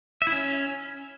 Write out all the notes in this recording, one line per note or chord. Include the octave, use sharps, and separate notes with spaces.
E5
E4
C#4